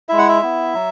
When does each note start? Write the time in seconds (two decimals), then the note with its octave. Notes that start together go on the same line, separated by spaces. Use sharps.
0.09 G#3 E4 E5
0.18 F#5
0.29 E5
0.42 B3 E4
0.74 F#3